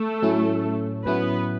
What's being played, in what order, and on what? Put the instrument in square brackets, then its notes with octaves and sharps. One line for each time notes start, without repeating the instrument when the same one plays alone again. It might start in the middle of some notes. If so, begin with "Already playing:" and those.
Already playing: [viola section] A3 A4
[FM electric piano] A2 F#3 C#4 E4
[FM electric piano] A2 F#3 C#4 E4 [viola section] B3 B4